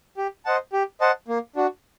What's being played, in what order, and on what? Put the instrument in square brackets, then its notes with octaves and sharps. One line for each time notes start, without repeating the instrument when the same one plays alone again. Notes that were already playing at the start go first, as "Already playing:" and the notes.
[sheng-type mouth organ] G4
C5 D#5 F#5 A5
G4
C5 D#5 F#5 A5
A#3
D4 F#4